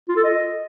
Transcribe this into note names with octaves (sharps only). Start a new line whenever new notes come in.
F4
A4
D#5